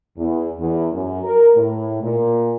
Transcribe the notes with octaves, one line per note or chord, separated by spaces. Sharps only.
E2
E2
F#2
A#4
A2
A#2